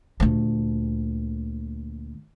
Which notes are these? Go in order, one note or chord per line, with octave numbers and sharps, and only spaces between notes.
D2 A#2